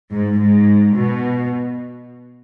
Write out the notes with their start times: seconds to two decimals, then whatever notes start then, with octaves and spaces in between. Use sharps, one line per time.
0.11 G#2
0.39 G#2
0.96 B2